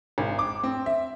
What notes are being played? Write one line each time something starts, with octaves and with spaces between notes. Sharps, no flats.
G#1
D6
C4
E5